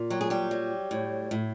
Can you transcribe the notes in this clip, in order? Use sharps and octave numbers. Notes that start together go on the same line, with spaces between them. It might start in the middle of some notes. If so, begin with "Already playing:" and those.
Already playing: A#2
F#3 G4
G#4
G3 G4
F#3
A2
A2